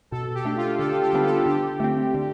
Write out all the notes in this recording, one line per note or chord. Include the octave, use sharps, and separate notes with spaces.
B2 A4
G4
A3 D4
F4
D3 A4
G4
G3 B3 D4
A4
D3 G4
A3 C4
D3